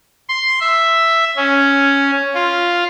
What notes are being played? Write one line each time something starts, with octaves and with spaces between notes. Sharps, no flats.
C6
E5
C#4
F4